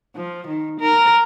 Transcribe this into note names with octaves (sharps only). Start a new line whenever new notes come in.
F3
D#3
A#4